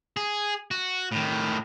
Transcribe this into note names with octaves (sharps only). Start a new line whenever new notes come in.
G#4
F#4
A2 D#3